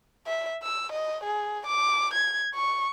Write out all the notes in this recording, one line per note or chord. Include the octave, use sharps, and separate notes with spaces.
E5
E6
D#5
G#4
D6
G#6
C#6